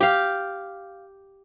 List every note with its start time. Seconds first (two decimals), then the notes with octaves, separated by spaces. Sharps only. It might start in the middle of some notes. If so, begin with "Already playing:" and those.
0.01 G4 F5